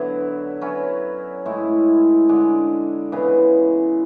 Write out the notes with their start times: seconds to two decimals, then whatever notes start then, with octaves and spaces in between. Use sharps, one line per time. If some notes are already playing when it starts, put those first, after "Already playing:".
Already playing: D3 F#3 B3 E4
0.61 F#3 C#4 E4 B4
1.45 A2 G#3 C#4 E4
2.29 D3 G#3 D4
3.12 C#3 E3 B3